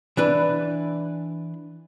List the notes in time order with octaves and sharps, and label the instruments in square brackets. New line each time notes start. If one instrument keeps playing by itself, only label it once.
[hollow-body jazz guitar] E3 D4 B4